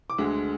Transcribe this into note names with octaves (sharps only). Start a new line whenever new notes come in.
D6
D2 D3 G#3